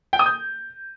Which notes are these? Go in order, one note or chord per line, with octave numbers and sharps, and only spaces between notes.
G5
D#6
G6